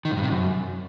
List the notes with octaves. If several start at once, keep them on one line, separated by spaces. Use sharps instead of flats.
D#3
G#2
G2
C3
F#2